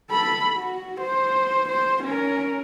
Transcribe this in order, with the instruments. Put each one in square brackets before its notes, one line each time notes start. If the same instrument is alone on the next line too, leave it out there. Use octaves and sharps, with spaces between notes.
[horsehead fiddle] A4 B5
F#4
C5
C5
C#4 A#4